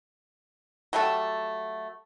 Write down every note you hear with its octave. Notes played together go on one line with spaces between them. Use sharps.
F#3 G3 A3 A4